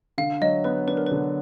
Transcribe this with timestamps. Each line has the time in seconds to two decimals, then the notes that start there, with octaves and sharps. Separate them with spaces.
0.18 D3 F5
0.41 F#3 D#5
0.64 B3 B4
0.88 D4 B4
0.97 A#4
1.07 D3 B4